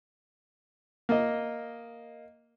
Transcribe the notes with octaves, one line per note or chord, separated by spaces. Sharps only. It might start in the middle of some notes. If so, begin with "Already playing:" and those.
A#3 D#5